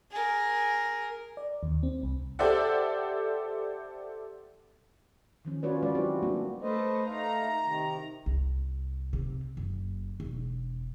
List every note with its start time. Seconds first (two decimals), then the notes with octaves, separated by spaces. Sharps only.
0.11 G#4 A#4
1.37 D5
1.63 D#2
1.83 C4
2.03 C2
2.39 G4 A4 C5 D5 E5 F#5
5.45 D#3 F3 C#4
5.63 C#4 F4 F#4 B4 C#5 D5
5.82 F3 F#3 G#3 C#4 B4 D5
5.95 C4 E4 F#4 G4
6.23 G3 A#3 B3 D4 F#4
6.62 A3 B4 C5 D#5
7.07 A3 D#4 F5 A#5
7.63 C3 D#3
8.26 C2
9.13 C3
9.57 F#1
10.20 E1